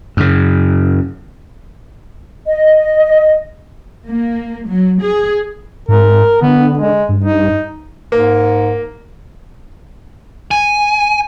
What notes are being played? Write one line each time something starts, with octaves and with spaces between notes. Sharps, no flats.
F#2 C#3
D#5
A#3
F#3
G#4
G#2 A#4
D3 B3
G#3
G2
D#4
G#2 A#3
G#5